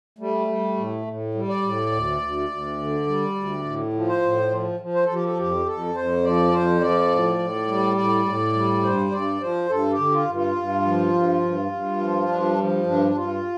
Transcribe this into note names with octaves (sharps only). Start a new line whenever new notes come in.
G3 A3
G3
A2
A2
G3
D5
A2
D2
D2
D2
D3
G3
D2
A2
F3
C5
A2
F3
F3
C5
F3 A4
G4
A4
F2 G4
F2 A4
F2 C5
F3 D5
F2 C5
F3 D5
A2
A2
G3
A2 D5
A2
G3
G2 C5
G2 D5
F3 C5
G2 A4
G4
D3
F4
G2
F4
G2
F3
G2
G2
G2
F3
G2 D4
F3
G2 D4
G2 F4